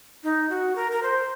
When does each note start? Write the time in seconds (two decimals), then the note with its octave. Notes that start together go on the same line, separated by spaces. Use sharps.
0.24 D#4
0.50 F#4
0.76 A#4
0.92 A#4
1.03 C5